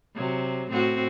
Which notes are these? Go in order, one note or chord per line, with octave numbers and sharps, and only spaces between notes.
C3 F#3
A2 C4 F#4